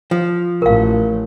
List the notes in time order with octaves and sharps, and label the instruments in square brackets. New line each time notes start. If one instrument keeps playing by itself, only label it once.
[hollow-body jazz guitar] F3
[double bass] A1 A2 [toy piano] A#4 F5